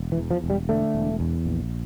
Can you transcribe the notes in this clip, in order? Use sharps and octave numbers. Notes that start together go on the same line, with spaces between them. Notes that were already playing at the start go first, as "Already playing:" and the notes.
Already playing: E1
E3
E2
F3
E1
G3
D3 A3
E1
E2
A#1